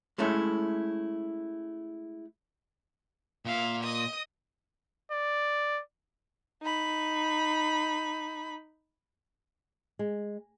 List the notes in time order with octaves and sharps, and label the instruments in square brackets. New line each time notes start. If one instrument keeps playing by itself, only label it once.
[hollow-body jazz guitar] G#3 A3 C#4 E4
[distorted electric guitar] A#2 [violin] E5 F5
[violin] D#5 D#6
[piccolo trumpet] D5
[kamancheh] D#4 B5
[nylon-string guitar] G#3